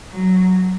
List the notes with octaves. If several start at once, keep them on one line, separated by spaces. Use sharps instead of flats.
F#3